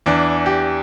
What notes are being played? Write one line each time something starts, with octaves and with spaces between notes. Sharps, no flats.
E2 E3 D4
G4